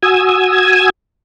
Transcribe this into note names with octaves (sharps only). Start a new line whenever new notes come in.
F#4 G#5 D#6 E6 G#6